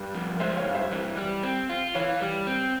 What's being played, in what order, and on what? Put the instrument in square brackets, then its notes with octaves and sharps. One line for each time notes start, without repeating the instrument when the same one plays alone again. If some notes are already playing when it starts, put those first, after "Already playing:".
Already playing: [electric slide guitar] G2
F3
[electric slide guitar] G#3 [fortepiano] C5 E5
[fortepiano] C#5 F5
[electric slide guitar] G2
[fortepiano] C5 E5
[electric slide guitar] E3
G3
C4
F4
[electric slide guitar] E3 [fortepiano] C#5 F5
[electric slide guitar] G3
C4